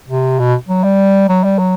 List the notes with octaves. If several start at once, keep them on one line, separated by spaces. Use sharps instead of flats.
C3
B2
F#3
G3
F#3
G3
F#3